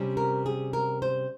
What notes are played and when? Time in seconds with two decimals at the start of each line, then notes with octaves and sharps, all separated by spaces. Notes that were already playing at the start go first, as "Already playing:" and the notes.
Already playing: C3 G3 C#4
0.17 A#4
0.46 G#4
0.73 A#4
1.02 C5